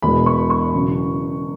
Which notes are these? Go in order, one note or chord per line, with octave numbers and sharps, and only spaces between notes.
E1 E2 B2 G#3 B5
C#6
C#6
E1 E2 C#3 F#3 C#4